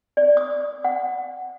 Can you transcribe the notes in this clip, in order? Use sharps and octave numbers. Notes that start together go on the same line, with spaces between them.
D5
D#6
F#5